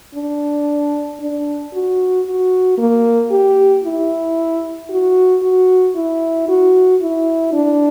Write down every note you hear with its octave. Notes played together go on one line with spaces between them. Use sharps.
D4
D4
F#4
F#4
A#3
G4
E4
F#4
F#4
E4
F#4
E4
D4